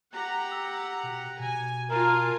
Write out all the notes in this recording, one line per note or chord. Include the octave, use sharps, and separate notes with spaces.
G4 F#5 A#5
E6
B2
B2 G#5
F4 A#4 G#5 A5